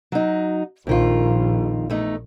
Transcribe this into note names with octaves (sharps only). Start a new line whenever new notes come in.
F#3 D#4
A#1 F2 D#3 F4
E2 A3 D#4